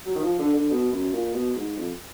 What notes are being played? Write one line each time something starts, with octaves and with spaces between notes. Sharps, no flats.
F#3
D#3
F3
D3
D3
B2
F#2
A#2
B2
G#2
F2